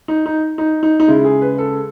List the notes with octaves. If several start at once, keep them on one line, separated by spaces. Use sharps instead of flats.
D#4
D#4
D#4
D#4
D#4
C#3 G#3 E4
G#4
B4
A4